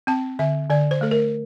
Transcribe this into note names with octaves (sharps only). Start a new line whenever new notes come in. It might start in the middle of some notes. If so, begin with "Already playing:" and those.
C4 A5
D3 E5
D3 D5
C5
A3 A4
A#4